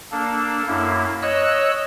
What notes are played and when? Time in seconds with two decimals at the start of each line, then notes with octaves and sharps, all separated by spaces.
0.12 A#3 D4 A4
0.67 F#2 A#3 E4
1.22 C#5 D#5 E6 F#6